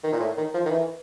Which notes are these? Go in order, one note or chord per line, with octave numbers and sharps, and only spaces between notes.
D#3
A#2
A2
D#3
F3
D#3
E3